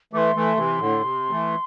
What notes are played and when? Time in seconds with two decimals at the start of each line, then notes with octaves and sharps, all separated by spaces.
0.13 E3 A3 D6
0.18 C6
0.35 E3 A3
0.56 C3 E3
0.79 A2 D3
1.01 C3
1.30 E3 A3